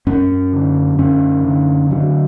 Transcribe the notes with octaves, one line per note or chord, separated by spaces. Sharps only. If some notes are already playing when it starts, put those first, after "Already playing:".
F#2 C#4
D3
F#2 C#4
D3
D3 F#3